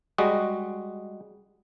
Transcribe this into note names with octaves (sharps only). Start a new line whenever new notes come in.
G3 G#3 F#4 D#5